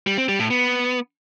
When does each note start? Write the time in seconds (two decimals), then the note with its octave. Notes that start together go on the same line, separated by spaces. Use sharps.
0.07 G3
0.18 C4
0.29 G3
0.40 A2
0.50 B3